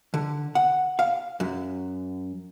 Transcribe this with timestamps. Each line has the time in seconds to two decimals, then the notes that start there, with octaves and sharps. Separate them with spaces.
0.14 D3
0.55 F#5
0.99 F5
1.40 F#2